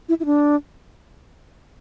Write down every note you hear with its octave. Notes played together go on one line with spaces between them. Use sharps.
E4
E4
D4